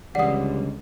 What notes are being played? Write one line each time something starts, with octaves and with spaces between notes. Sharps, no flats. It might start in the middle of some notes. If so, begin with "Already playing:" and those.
C#2 D3 E3 G3 D5 F#5 D#6